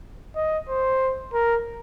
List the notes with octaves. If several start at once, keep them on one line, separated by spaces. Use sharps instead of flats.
D#5
C5
A#4